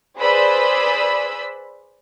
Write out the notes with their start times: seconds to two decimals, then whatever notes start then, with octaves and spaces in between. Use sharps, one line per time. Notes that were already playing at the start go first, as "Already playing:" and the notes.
0.19 G#4 B4 C5 D5 B5 E6